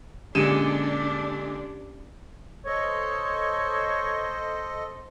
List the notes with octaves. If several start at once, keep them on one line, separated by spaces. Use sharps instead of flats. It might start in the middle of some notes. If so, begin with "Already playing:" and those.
A#2 D3 G#3 C#4 D4 G4 D#7 E7
A4 C5 C#5 D#5